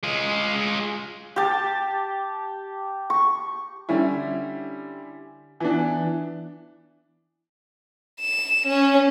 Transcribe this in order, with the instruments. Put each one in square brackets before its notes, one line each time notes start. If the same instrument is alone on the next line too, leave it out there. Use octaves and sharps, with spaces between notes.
[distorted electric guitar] G#3 F4
[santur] G4 A5
C#6
[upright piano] D3 G3 C#4 E4
E3 B3 D4
[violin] E7
C#4